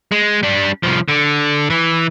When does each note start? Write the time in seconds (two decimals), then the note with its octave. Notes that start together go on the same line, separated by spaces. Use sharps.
0.12 G#3
0.43 G3 D4
0.83 C2 F3
1.08 D3
1.70 E3